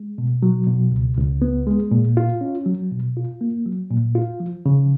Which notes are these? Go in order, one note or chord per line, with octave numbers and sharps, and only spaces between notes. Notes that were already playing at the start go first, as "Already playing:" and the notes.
Already playing: G#3
B2
F#3
B2
C#2
C#2
B3
G#3
A#2
F4
C#4
F#3
B2
F4
A#3
F#3
A#2
F4
F3
C#3